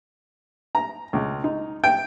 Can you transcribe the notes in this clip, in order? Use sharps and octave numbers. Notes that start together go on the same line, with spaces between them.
A#5
C#2
D#4
G5